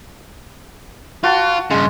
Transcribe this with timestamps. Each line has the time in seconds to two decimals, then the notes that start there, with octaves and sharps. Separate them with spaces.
1.24 F4 F#4 A5
1.71 G2 C#3 G#3